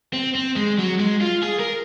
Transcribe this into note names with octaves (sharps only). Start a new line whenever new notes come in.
C4
C4
G#3
F#3
G#3
F4
G#4
A#4